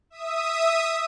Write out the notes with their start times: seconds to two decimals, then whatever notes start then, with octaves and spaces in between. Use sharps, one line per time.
0.10 E5 D#6